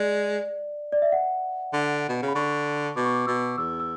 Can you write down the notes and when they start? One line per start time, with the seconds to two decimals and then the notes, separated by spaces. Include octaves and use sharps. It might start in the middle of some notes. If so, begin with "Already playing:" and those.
Already playing: G#3 D5
0.93 D5
1.02 E5
1.12 F#5
1.73 D3
2.09 B2
2.22 C#3
2.28 B5
2.35 D3 C#6
2.96 B2 D6
3.05 C#6
3.14 D6
3.27 B2 E6
3.58 E2 E6
3.80 E6